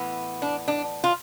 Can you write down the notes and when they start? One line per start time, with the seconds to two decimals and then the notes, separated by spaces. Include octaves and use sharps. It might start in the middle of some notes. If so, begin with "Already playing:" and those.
Already playing: A2 E3 B3
0.42 D4
0.68 D4
1.04 F4